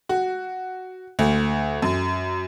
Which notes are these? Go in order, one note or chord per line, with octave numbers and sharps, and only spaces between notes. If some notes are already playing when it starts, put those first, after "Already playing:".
F#4
D2
F#2